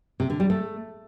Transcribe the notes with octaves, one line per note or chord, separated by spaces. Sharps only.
C3
D3
G3
A3